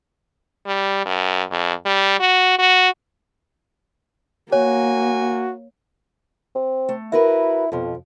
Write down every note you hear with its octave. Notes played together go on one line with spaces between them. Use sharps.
G3
F#2
F2
G3
F#4
F#4
A#3 F#4 C#5 G#5
C4
A3
E4 F#4 A#4 B4
F2 B2 F3